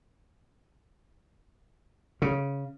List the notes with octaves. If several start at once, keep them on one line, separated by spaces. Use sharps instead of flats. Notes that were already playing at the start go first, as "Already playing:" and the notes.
C#3